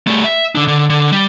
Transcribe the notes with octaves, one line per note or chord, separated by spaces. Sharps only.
G3 A3
E5
D3 D4
D3
D3
G3